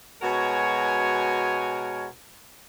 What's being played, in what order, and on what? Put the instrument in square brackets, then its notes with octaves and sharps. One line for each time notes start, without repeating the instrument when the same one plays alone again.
[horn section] B2 G#3 F#4 A#4 C#5 G#5